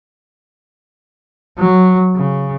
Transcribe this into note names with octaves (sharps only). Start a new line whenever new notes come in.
F#3
C#3